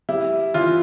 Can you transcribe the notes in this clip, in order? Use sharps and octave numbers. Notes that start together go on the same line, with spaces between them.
G3 E4
E3 F4